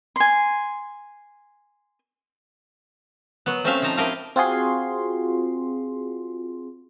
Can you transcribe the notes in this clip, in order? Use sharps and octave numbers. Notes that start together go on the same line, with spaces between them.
G#5 C6
F#3 B3
A3 C4 C#4 C5 E5 F5
F3 D#4 A5 A#5
E4 G4 A#4 D#5 F5
C4 F4 F#4 G#4 C6